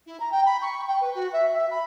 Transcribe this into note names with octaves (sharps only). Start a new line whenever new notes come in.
E4
A#5
G5
B5
C#6
G5
B4
F#4
E5
E5
B5